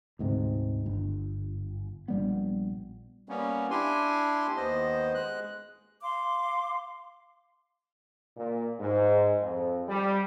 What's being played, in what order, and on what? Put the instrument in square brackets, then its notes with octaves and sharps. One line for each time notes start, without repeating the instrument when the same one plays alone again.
[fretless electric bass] D2 G#2 C3
G1
A#1 G3 B3
[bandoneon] G3 A#3 B3 C#4
D4 E4 G4 G#5 C6
D#2 B3 C5 D#5
G#3 F#6
[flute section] F5 C6 D6
[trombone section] A#2
G#2
F2
G3